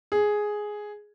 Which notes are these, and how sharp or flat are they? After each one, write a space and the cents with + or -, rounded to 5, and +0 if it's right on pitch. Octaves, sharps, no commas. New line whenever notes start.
G#4 +5